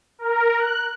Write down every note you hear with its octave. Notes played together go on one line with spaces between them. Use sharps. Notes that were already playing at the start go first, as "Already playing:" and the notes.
A#4
F#6